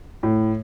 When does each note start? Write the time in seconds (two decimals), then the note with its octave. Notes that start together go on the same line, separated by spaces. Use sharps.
0.23 A2